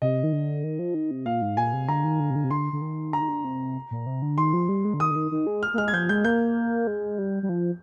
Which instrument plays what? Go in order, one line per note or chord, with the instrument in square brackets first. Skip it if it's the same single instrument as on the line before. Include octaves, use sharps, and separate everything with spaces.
[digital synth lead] C3 [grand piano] D#5
[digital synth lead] D#3
D3
D#3
F3
D#3
C3
[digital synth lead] A#2 [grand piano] F5
[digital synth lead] G#2
[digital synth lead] A#2 [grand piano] G#5
[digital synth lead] C3
[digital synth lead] D3 [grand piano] A#5
[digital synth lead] D#3
D3
C3
D3
C3
[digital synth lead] D3 [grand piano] C6
[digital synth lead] D3
D#3
[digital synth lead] D3 [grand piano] A#5
[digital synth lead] D#3
D3
C3
A#2
C3
D3
[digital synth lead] D#3 [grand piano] C6
[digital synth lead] F3
G3
G#3
D3
[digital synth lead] D#3 [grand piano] D#6
[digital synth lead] D3
D#3
D#3
G#3
[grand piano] F6
[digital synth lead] A#3
[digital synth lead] G#3 [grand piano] F6
[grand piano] G#6
[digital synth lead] F3 [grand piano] G6
[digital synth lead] G#3 [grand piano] G6
[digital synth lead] A#3 [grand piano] G6
[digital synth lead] G#3
G3
G3
F3